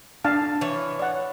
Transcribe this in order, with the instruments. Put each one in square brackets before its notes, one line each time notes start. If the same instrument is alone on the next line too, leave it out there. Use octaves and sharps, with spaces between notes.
[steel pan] D4 F5 A5
[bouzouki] E3 C#5
[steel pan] D5 F#5